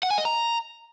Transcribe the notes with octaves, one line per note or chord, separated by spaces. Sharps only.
F#5
G#5
D#5
A#5